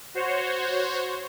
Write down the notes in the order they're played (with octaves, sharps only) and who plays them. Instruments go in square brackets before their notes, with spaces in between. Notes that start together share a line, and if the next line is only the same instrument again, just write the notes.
[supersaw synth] F#4 C5 C#5